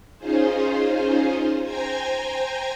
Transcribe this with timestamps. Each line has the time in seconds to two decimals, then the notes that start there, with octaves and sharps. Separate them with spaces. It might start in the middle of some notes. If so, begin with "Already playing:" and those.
0.18 C#4 D#4 F4 G#4 C5
1.63 C5 G5 G#5 A#5 G#6 A#6